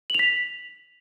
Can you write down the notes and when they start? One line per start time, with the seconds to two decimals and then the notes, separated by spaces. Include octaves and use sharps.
0.10 F#7
0.15 F7
0.19 B6